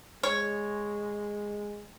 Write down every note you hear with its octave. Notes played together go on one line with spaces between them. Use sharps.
G#3 C#5